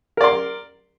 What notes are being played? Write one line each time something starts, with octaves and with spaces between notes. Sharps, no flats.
A#4 D5 C6